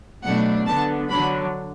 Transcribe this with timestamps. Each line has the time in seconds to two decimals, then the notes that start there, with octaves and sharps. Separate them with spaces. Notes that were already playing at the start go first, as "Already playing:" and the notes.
0.24 B2 F#3 A3 D4 F#5
0.67 D3 B3 D4 A5
1.09 D3 F#3 D4 B5